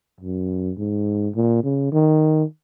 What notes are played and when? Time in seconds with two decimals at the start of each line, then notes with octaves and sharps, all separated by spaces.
0.20 F#2
0.77 G#2
1.35 A#2
1.64 C#3
1.92 D#3